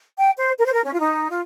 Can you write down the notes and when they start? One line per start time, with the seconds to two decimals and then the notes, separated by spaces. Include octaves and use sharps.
0.18 G5
0.37 C5
0.58 A#4
0.65 C5
0.71 A#4
0.84 C#4
0.93 F4
0.99 D#4
1.29 F4